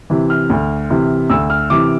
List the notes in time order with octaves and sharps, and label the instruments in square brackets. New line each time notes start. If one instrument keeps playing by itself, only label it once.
[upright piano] C3 E3
F6
D2
C3 E3
D2 E6
F6
C3 E3 D6